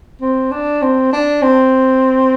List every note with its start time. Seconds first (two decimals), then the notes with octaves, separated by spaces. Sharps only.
0.21 C4
0.52 D4
0.82 C4
1.13 D4
1.42 C4